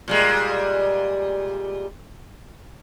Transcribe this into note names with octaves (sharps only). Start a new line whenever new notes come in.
A#2 G3 G#3